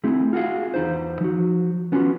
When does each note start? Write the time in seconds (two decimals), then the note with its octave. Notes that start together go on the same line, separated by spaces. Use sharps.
0.04 A3 C4 E4 G#4
0.33 F4 F#4 G#4 F5
0.74 E2 D#4 C5
1.21 F3 F#4
1.92 B3 C#4 F4 F#4